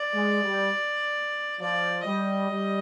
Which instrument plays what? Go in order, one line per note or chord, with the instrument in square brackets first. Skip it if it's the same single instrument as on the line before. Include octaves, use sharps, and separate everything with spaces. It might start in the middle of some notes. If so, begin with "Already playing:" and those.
Already playing: [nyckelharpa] D5
[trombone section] G#3
G3
[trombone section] F3 [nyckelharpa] D5
[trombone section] G3 [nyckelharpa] D#5
[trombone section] G3